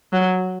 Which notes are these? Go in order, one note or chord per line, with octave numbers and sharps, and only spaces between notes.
F#3